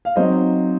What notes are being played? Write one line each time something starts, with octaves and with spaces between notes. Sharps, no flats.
F5
F#3 C4 D#4 C5 D#5